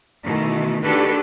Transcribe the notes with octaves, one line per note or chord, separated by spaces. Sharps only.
B2 D#3 E3 A3
D#3 D4 F#4 G4 A4 B4